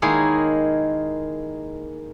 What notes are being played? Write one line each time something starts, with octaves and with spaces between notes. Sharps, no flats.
D#3 G#3 A#3 E4 G#4 C#5